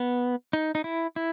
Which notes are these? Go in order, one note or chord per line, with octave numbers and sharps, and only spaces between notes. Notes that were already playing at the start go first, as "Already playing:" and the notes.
Already playing: B3
D#4
D#4
E4
E4